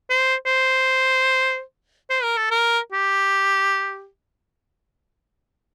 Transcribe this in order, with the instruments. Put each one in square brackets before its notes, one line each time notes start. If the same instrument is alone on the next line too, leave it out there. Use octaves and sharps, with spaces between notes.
[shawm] C5
C5
C5
A#4
A4
A#4
G4